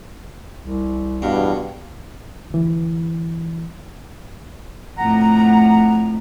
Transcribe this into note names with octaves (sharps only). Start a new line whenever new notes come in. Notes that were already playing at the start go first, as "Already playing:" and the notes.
C2
E2 G2 B2 F5
D2 E3
F2 A2 F#5 A#5